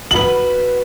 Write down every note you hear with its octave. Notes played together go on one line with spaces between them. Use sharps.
F#4 B4 F#7